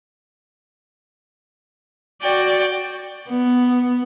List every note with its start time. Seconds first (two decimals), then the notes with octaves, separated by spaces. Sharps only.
2.22 F#4 D5 G5
3.29 B3